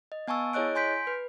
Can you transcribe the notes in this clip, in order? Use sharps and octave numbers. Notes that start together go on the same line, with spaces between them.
D#5
B3 G#5 A5 C#6 E6
E4 G#4 C#5 D#5 F#6 D7
G#5 C6 G6 B6 D7
B4